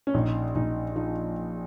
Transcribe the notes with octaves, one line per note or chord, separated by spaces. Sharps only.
C#4
A#1 D#4
A#1 D#4
F3 D#4